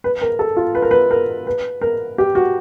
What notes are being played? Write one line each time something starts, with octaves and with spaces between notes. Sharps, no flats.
B4
A#4
A4
F4
B4
A#4
B4
A#4
B4
A#4
G4
F#4